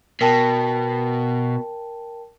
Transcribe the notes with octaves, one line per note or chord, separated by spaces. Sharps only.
B2 A#4 G5 A5